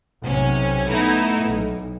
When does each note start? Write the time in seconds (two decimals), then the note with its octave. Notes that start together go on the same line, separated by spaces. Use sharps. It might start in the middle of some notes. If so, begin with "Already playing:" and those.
0.22 B1 C3 C#4
0.89 A3 B3 D#4 E4
1.46 B1